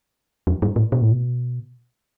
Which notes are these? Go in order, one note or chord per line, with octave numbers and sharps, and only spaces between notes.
F2
G2
A2
B2
A2
B2